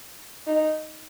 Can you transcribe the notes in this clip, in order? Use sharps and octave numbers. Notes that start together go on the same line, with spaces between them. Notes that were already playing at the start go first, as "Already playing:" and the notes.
D#4